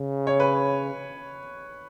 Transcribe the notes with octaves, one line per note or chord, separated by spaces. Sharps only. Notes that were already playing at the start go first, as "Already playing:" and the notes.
Already playing: C#3
C#5
B4